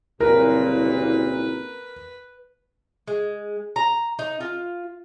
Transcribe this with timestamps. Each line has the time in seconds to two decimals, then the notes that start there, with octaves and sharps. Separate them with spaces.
0.20 F#1 C2 A#2 A#4 B4
3.08 G#3
3.76 A#5
4.19 D#4
4.40 F4